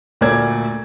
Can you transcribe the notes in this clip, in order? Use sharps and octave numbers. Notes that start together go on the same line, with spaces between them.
D2 A#2 A3 A#4 D5 G#6